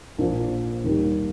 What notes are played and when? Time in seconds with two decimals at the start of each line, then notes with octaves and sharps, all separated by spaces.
0.18 A#1 A#2 F3
0.84 D#2 D#3 G3